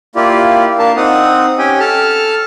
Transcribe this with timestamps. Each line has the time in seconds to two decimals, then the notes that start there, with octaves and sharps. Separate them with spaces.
0.16 A#3 E4 F4 G4 D5
0.79 A#3 D4 A#4 F5 A5
0.97 C4 D#4 F#5 D#6
1.58 C#4 G4 G5 G#5
1.80 A4 A5 F6